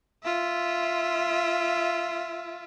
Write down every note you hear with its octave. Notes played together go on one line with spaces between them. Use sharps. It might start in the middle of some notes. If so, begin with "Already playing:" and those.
F4 E5